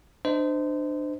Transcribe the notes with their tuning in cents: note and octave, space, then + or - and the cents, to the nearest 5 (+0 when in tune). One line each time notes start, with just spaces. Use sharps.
D4 +30 C5 -25 D#5 +20